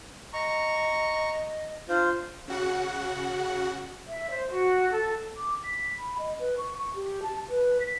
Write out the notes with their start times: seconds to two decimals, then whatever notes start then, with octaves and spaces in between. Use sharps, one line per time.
0.33 D#5 A#5 C#6
1.89 D4 F4 C5
2.48 C#3 F#4 F#5
4.06 E5
4.30 C5
4.50 F#4
4.90 A4
5.37 D6
5.64 B6
5.99 B5
6.19 D#5
6.40 B4
6.58 C#6
6.78 C#6
6.95 G4
7.23 A5
7.49 B4
7.81 B6